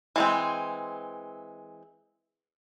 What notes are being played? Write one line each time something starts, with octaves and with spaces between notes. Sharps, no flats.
E3 G#3 C4